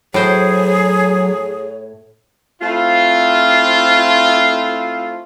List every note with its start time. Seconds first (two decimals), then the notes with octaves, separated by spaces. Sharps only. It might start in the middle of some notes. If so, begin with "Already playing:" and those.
0.14 A2 F#3 G#4 C5 C#5
2.62 A3 C4 E4 F4